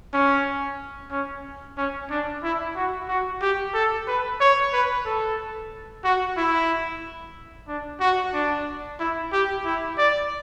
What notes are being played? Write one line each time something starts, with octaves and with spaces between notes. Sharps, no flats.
C#4
C#4
C#4
D4
E4
F#4
F#4
G4
A4
B4
C#5
B4
A4
F#4
E4
D4
F#4
D4
E4
G4
E4
D5